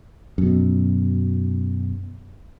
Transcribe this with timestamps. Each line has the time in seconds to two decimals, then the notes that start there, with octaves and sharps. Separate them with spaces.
0.38 F#2 B2